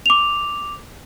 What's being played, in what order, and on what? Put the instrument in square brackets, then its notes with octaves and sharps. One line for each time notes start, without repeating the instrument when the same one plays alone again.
[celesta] D6 F7